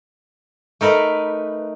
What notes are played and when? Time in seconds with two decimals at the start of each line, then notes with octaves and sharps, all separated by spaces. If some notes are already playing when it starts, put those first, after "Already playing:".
0.81 A3 D#4 A#4 B4